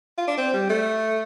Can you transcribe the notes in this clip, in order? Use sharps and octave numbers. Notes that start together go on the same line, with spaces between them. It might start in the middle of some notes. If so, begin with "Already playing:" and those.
F4
D4
C4
G3
A3